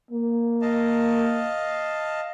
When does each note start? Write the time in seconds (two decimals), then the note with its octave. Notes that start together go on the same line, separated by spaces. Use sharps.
0.11 A#3
0.62 D#5 F5 A5